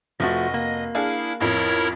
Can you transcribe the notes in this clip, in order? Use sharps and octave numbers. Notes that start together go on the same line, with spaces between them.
F1 F3 A3 F#4 D#5
A#3
D4 E4 G#4 F5
A1 F2 F3 E4 A#4 C#5